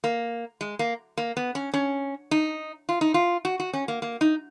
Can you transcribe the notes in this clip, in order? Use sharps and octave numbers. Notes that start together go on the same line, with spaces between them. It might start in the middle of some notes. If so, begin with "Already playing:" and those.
A#3
G#3
A#3
A#3
B3
C#4
C#4
D#4
F4
D#4
F4
F#4
F#4
C#4
A#3
A#3
D#4